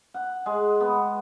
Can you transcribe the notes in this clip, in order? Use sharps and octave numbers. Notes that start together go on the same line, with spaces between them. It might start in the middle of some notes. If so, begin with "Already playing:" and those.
F#5
G#3
B3